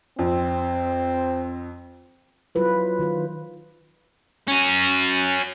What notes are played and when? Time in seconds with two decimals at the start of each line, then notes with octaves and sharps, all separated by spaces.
0.19 F2 C4
2.55 F#3 E4 F4 B4 C5
2.99 D#3 F4 C5
4.48 C#4 F#4